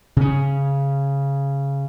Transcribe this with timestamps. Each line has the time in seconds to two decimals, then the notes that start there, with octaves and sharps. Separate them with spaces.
0.17 C#3 C#4